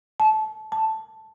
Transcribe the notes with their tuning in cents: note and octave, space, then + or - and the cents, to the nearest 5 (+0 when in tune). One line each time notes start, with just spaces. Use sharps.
A5 -25
A5 +0